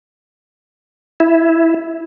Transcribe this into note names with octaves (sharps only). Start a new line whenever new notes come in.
E4